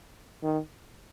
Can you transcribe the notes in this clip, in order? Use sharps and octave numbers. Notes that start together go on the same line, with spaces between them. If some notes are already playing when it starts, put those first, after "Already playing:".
D#3